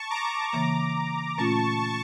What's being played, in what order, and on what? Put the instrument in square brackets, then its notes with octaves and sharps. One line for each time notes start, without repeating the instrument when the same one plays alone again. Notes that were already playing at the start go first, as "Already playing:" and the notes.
Already playing: [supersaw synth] A5 C#6
A#5 D6
[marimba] C#3 E3 A#3 [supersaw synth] A#5 D6
[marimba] A#2 A3 C#4 F4 [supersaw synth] A5 C#6